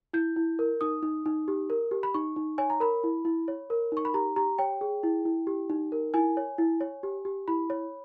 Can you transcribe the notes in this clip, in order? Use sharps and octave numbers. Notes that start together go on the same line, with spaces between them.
E4 G6
E4
A#4
D#4 D#6
D#4
D#4
G4
A#4
G4
B5
D#4 C#6
D#4
C#5 G#5
A#5
A#4 B5
E4
E4
C#5
A#4
D#4 C#6
B5
G4 A#5
G4 A#5
C#5 G5
G#4
E4
E4
G4
D#4
A#4
E4 G#5
C#5
E4
C#5
G4
G4
E4 B5
C#5